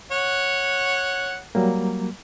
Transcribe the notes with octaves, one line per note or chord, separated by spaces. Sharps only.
C#5 F#5
F#3 G3 A#3